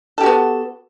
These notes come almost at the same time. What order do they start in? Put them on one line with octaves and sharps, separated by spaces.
A4 G4 F#4 B3